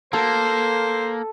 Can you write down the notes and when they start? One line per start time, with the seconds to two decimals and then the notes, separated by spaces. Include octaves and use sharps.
0.13 A#3 A4 C5